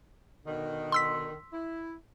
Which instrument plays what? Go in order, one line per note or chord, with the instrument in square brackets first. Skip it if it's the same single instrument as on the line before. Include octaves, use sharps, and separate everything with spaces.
[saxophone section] B2 D3 D#3
[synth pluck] C6 E6 B6
[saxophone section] E4